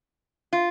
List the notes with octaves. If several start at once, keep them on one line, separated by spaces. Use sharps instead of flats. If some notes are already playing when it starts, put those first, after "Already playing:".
F4